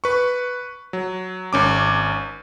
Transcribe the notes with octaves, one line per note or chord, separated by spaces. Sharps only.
B4 C#6
F#3
G#1 C#4 D6